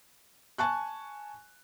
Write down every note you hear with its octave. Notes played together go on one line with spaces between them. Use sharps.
G#5 A5 C#6 F#6